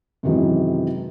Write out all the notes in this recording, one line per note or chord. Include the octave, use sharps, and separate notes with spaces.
F#2 C3 D#3 E3 F#3 G#3